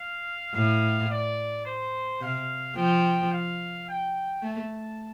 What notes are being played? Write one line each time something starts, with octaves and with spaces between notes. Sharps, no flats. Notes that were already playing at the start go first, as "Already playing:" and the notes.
Already playing: F5
A2 F5
D5
C5
C3 F5
F3 G5
F5
G5
A3 A5